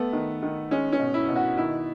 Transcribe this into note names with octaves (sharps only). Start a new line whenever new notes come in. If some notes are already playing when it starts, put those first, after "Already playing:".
Already playing: A3 B3
D#3
D#3
G#3 C#4
C#4
B2
E4
B2
F#4
D#3 E4